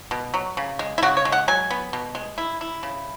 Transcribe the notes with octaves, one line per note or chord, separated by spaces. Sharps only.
B2
F#3
C#3
G#3
E4
C#3 F#4
C#5
G#3
F#5
F#3 G#5
B3
B2
G#3
E4
E4
C#3